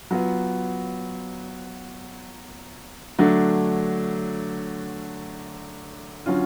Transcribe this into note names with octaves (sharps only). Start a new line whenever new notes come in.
F#3 B3 F4
D3 F#3 A3 D4
D3 F#3 C#4 F4